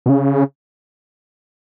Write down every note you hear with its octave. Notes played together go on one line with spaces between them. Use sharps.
B2
C#3